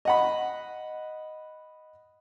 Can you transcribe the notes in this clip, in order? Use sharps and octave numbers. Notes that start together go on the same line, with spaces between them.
D#5 F#5 B5